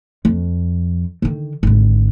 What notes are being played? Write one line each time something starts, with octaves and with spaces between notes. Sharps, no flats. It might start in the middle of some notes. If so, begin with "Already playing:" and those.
F2
D3 D#3
G#1 D3